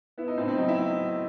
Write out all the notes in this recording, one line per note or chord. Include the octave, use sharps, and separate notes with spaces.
B3 E4
D#4
A2 C4
C4
F#3 D#4
E4